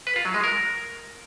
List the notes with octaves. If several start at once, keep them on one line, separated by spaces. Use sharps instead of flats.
B4
F4
F#3
G#3
A#4